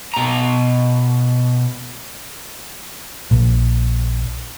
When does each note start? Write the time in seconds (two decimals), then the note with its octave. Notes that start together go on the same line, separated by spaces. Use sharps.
0.14 B2 A#5
3.31 A#1